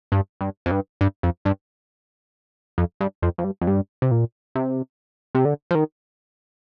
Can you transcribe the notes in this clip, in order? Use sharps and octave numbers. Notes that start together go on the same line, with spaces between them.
G2
G2
F2
G2
G2
F2
G2
F2
G2
F2
F2
G2
F2
G2
C3
A#2
C3
C3
D3
F3
D#3